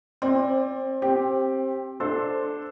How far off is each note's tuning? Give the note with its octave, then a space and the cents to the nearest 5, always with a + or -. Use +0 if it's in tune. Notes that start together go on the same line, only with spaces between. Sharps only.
C4 +25 D5 +0
C4 +20 G4 +0
D4 +0 A4 +0 C5 +0